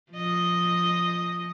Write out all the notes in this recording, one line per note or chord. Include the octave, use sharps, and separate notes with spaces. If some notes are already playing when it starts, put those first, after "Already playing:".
F3 D#5